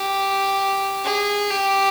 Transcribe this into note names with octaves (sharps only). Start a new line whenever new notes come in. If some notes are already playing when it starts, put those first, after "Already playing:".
Already playing: G4
G#4
G4